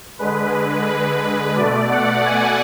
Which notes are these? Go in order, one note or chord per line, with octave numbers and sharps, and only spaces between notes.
D3 G#3 B4
B4
B2 A3 D5
F#5
G#5